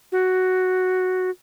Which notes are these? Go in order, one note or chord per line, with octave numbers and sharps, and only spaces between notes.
F#4